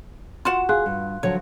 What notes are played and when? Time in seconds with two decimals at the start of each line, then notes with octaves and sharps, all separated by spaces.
0.45 F4 F#4 F#5 C6 E7
0.69 G#4 F5 C6 F#6
0.86 G2
1.23 D3 F3 F#3 C#5